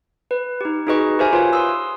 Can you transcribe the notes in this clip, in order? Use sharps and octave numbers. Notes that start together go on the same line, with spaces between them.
B4
D#4 G4
D#4 F#4 G#4 B4 D#5 C#6
G4 A#4 C5 E5 G#5
F4 B4 C#5
C6 D#6 E6